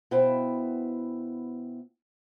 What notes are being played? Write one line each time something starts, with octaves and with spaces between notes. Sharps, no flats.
B2 B3 E4 C5 F5 G5